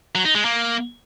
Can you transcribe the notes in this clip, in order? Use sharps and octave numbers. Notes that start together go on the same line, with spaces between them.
F#3
D#4
G#3
A#3